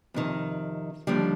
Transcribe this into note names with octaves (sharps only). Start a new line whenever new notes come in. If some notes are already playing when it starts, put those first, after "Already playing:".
F2 C3 D#3
D#2 D3 F3 G3